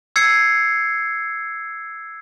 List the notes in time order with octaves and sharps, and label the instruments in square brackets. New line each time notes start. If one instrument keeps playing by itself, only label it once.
[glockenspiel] E6 G#6 C7 C#7